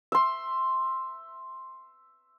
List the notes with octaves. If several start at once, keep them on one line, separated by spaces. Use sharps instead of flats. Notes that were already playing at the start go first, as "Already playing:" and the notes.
E5 C6